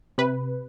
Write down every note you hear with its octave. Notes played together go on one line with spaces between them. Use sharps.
C3 B4